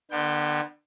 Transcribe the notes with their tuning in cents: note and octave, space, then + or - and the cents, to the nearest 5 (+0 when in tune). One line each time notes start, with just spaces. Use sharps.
D3 +30 B3 -25 G5 -5